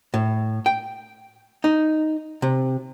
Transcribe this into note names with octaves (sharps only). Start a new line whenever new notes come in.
A2
G5
D#4
C3